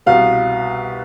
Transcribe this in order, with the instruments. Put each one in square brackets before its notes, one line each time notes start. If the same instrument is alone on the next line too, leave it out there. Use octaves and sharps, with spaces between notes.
[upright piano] C2 B2 B3 F5